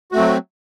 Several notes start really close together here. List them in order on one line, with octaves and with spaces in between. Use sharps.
F#4 A3 C4 F#3